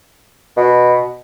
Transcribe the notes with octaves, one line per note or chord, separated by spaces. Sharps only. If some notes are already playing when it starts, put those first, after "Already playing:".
B2